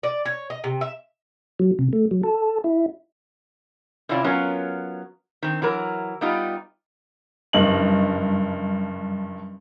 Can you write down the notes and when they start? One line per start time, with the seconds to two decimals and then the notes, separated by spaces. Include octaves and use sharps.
0.03 D5
0.25 C#5
0.50 D#5
0.64 C3
0.81 E5
1.59 F#3
1.79 C3
1.93 A3
2.11 F#3
2.23 A4
2.64 E4
4.09 C3 C#4 E4 F4 D5
4.24 F#3 B3 C#4 F4 A#4
5.43 D#3 C4
5.62 E3 F#3 A#4
6.21 G3 B3 D#4 F4 G4
7.53 F#1 G2 D#5 F#7